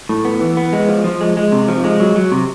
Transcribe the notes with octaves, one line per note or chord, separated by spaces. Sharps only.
A2
B3
E3
B3
G#3
F3
F3
G#3
G#3
C3
F3
G#3
F#3
F#3
C3